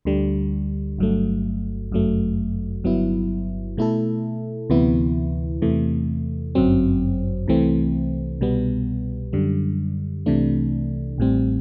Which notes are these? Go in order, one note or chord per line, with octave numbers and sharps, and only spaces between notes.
D2 D3 G3
G1 G2 F#3 A3
G1 F#2 F#3 A3
G1 G2 F#3 B3 E4
B2 A3 E4 A4
D2 C3 E3 B3 E4
E2 C3 E3 A3
G1 F#2 F#3 C4
C2 C3 E3 A3 C4
C2 B2 G3 B3
F#2 D3 G3
C2 C3 E3 A3 D4
A1 A2 G3 C4